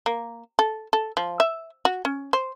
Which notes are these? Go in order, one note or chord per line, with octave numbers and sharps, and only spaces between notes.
A#3
A4
A4
F3
E5
F#4
C#4
C5